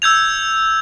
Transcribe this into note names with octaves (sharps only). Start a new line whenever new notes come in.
E6 G6 G#6 F7